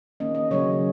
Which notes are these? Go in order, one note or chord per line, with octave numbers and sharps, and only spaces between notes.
D#3 A#3 C#4 D#5
D#5
C#3 F#3 C#4 C#5